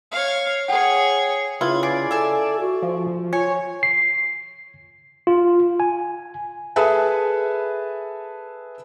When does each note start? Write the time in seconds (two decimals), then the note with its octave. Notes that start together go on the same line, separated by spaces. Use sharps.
0.11 C#5 F5
0.68 G#4 C#5 F#5 G5
1.61 C#3 E4 F4 B4 G#6
1.83 G#4 D5
2.11 A4 E5 G#5
2.60 F#4
2.82 F3
3.33 F4 C#5 G#5
3.83 C7
5.27 F4
5.80 G#5
6.76 G#4 A4 B4 E5 G#5 A5